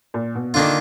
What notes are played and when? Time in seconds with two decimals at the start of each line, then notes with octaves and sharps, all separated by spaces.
0.14 A#2
0.35 B2
0.54 D3 D#3 A#3 D4 F4